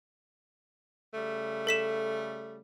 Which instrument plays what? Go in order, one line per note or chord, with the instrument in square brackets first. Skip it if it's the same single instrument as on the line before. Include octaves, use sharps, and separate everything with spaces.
[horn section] C#3 G3 A3
[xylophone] A4 B6 E7